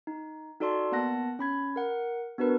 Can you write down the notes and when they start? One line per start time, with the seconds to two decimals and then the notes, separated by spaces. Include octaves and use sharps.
0.07 D#4
0.61 D#4 F#4 A4 D5 A5 C6
0.92 A#3 B3 F#5 A5 F#6 A#6
1.39 C#4 B5 G#6
1.76 A#4 F#5
2.38 B3 D4 F#4 A#4 B4